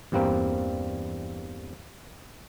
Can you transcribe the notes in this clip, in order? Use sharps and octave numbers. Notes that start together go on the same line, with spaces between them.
E2 G2 G3 A#3 C4